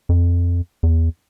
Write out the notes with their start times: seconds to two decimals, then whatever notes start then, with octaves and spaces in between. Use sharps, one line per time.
0.09 F2
0.83 E2